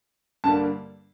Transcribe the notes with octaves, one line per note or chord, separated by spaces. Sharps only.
G2 D3 G3 A#3 A5